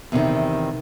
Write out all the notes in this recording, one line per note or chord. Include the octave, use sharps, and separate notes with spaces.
E2 C3 D#3